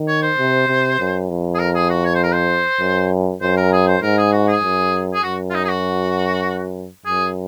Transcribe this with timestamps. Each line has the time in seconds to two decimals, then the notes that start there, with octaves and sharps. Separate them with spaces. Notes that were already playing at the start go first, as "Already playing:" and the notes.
Already playing: D#3
0.08 C#5
0.22 C5
0.38 C3
0.68 C3
0.99 F#2
1.29 F2
1.55 G#4
1.59 A#4
1.75 G#4
1.90 F#4
2.05 C#5
2.15 C5
2.24 A#4
2.32 C5
2.80 F#2
3.41 F#2 C5
3.57 A#4
3.73 G#4
3.87 C5
4.02 G#2 A#4
4.18 G#4
4.32 F#4
4.48 G#4
4.64 F#2
5.14 G#4
5.24 F#2 F#4
5.50 F4
5.54 D#4
5.65 G#4
5.69 F#4
7.05 F#2 G#4